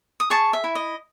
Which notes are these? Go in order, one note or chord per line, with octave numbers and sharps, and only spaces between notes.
D#6
G#4 A5 C#6
E5
E4
D#5